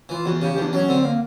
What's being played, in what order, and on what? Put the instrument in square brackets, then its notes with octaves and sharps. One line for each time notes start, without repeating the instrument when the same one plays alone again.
[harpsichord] E3 [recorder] F4
[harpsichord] E2 [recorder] F#4
[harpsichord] C#3 [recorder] G4
[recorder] G4
[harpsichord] E2
[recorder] D4
[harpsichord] F#3 [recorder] C#4
[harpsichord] D3 [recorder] C4
[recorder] A#3